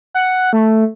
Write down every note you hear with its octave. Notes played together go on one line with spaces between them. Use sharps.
F#5
A3